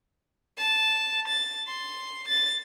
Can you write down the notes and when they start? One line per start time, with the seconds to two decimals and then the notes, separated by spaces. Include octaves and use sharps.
0.57 A5
1.28 A6
1.68 C6
2.28 A6